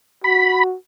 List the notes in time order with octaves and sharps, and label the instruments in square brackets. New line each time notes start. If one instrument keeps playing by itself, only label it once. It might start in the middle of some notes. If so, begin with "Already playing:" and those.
[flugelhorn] F#4 [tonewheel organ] B5